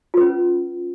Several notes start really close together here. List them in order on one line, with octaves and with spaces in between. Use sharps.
F4 B4 C#4